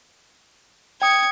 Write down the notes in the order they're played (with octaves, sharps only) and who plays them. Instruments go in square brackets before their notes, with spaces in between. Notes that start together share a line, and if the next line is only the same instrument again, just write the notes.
[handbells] G5 D#6 [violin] G#6 C#7